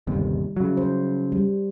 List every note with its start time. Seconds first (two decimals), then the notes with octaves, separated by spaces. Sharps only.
0.07 G1 D#2 C3 G3
0.57 C#3 F#3
0.77 C5
1.32 G3